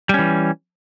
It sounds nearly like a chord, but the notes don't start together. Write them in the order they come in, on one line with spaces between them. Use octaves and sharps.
G3 C#4 E3